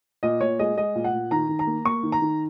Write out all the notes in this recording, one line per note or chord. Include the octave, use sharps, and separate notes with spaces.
A#2 D#5
A#2 C#5
G#3 D#5
G#3 D#5
A#2
F#5
A#2
D#3 A#5
D#3
A#5
A#3
A#3 C#6
D#3
A#5
D#3